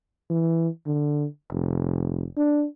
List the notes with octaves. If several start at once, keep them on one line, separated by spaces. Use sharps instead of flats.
E3
D3
F1
D4